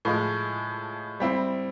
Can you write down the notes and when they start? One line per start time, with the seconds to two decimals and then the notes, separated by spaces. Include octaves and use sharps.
0.05 A2 F3 G#3
1.20 G3 C4 E4